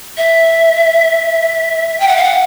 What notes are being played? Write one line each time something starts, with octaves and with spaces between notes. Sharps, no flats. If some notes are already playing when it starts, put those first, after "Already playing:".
E5
G5
F#5
F5
F#5